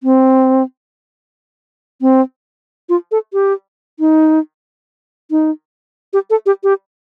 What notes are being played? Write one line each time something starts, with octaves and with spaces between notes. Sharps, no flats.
C4
C4
F4
A4
G4
D#4
D#4
G4
A4
G4
G4